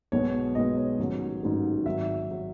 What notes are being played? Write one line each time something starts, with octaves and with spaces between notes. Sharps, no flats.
B1 B2 G#3 B3 C#5
B1 B2 G#3 B3 D#5
C#5
A1 G#2 D#3 F#3 B3
A1 G#2 D#3 F#3 B3
G#1 G#2 F#3 E5
F#3